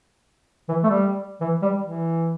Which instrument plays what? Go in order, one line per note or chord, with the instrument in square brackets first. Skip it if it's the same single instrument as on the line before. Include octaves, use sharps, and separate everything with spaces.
[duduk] E3
A3
G3
E3
G3
E3